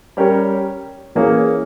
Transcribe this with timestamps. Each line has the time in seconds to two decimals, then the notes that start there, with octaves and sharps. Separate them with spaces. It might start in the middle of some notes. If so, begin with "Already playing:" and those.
0.17 G3 C#4 G4 A#4 C#5
1.15 E3 A#3 C#4 G#4 C#5